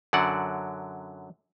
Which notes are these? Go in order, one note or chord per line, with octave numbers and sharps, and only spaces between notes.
F#2 D3 F#3 D5 F#5